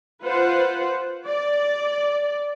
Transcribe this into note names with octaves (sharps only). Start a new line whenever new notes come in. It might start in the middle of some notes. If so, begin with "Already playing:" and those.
F4 B4 C5 F#5
D5